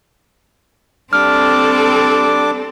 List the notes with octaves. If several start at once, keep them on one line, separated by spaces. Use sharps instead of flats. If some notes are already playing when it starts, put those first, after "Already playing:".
G3 C4 D4 A4 D6 F6